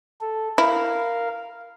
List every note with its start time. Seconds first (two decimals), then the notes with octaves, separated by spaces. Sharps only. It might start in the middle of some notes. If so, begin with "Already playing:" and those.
0.21 A4
0.58 E4 A#4 F5